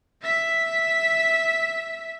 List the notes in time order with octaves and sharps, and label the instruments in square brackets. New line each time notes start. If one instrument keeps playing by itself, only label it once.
[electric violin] E5 B6